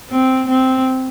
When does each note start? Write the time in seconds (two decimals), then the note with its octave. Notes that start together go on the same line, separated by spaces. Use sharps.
0.10 C4
0.47 C4